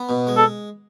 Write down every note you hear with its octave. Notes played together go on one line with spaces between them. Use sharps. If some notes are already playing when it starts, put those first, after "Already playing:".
Already playing: B3
B2
G#3
A4